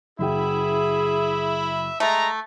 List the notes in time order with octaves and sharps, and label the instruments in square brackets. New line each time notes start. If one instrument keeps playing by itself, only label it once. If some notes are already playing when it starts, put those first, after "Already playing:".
[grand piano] F#1 F#4 G5 [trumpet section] E4 E5 B5 [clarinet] G#4
[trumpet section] G#3 A#5 [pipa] A3